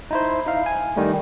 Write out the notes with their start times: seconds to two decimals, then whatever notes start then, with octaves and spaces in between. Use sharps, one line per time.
0.11 D#4 E4 C5
0.46 D#4 E4 F5
0.66 G#5
0.96 D#3 G3 A3